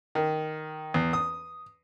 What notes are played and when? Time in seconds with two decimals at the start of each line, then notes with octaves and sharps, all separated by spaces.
0.15 D#3
0.94 E2
1.13 D#6